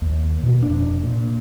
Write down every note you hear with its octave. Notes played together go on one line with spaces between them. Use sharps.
D#2
B2
F1 D4
A#2